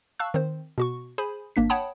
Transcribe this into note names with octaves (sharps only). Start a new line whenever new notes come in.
F5 A5 C#6 E6 F#6
D#3 C4 C5
B2 F#4 C#6
G#4 C5 G#5 B5
G#1 A#3 D4 B6
C#5 F#5 G5 A5 B5 D#6